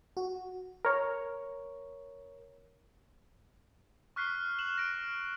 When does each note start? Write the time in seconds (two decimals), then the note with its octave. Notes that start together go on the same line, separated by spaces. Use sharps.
0.17 F#4
0.85 A#4 C#5
4.16 C#6 F6 F#6 B6 C7
4.59 E7 F#7
4.78 A#6 D7